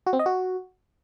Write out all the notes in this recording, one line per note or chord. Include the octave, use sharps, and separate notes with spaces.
F#4
C4
D#5
F#4